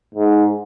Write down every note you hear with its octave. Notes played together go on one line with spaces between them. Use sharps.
G#2